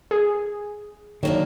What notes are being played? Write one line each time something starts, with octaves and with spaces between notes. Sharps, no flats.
G#4
D#3 F#3 A#3 D4